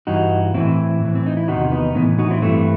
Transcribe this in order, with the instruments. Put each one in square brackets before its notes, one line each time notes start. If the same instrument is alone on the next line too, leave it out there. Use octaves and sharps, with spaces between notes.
[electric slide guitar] G2 E3 D#4 F#4
A2 E3 C4 E4
A2 E3
C4
D#4
E4
E2 C3 D#3 D#4 F#4
B3 D#4
A2 E3 B3 D#4
D#4 F#4
C4 E4
G2 E3 A3 C4